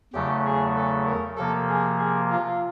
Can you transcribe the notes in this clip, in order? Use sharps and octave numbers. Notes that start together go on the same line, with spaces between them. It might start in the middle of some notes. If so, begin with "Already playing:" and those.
E2 C#3 F#3 A3 G4
G#4
A4
A#4
C3 F3 A#3 A4
G#4
G#4
F4